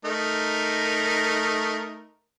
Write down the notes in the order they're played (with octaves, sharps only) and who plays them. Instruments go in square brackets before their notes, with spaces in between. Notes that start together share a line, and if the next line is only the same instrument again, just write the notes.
[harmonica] A3 D#4 A#4